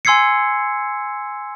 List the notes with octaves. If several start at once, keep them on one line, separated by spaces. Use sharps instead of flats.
G#5 C6 E6 G#6 C7 C#7